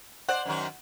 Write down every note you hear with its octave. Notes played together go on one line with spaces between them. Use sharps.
C5 D5 F#5
F#2 D#3 F#3